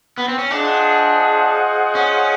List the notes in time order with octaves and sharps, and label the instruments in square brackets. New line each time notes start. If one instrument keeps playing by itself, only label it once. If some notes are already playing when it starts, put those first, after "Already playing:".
[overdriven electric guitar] B3
C4
C#4
[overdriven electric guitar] D4 [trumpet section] F4 G#4 C5 D#5 F#5
[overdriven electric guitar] C#4